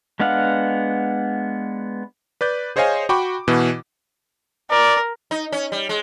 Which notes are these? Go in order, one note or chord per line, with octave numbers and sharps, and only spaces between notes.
G#3 B3 D4 F5 F#5
B4 D5 G6
G#4 C5 C#5 D#5 F5 G#5
F#4 G5 B5 C#6 D6
B2 E3 F#4
A#4 D5
D#4
C#4
G3
G#3